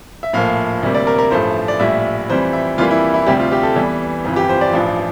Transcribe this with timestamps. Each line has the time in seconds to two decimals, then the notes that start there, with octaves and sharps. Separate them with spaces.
0.23 E5
0.33 A#1 A2 F3 A#3 F5
0.83 D2 C3 G3 A#3
0.95 D5
1.07 A#4
1.19 A#4
1.31 A1 G2 F3 A3 C5
1.68 D5
1.80 A#1 A2 G3 E5
2.30 F2 E3 G3 C5
2.53 E5
2.78 F2 E3 G3 A#3 F4
2.91 E4
3.14 E4
3.27 D2 C3 G3 G4
3.40 F4
3.52 G4
3.63 A4
3.76 E2 E3 G3
4.25 G1 F2 E3
4.36 G4
4.49 C5
4.61 D5
4.73 A1 G2 F3